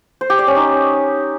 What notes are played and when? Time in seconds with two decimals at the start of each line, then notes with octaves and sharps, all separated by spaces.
0.21 C5
0.30 G4
0.39 D5
0.47 C#4
0.56 D#4